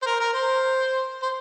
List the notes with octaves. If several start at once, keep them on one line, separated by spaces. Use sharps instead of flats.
C5
A#4
A#4
C5
C5